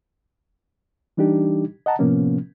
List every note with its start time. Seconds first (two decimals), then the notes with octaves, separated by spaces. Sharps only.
1.17 E3 G3 D4 D#4 G4
1.86 D#5 F#5 A5 A#5
1.99 A2 C3 F3 A#3 B3 C#4